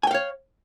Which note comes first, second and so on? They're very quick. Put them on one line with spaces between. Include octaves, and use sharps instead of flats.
G#5 G5 F5 C#5